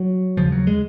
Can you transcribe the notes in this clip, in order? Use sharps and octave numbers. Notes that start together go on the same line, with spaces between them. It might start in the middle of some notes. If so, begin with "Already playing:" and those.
Already playing: F#3
D#2 C#3 F3
F#3
G#3